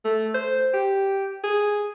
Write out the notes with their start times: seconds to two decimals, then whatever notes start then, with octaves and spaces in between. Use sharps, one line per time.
0.05 A3
0.34 C5
0.74 G4
1.44 G#4